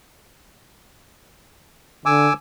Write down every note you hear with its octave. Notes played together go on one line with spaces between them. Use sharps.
D3 G#5 D6 E6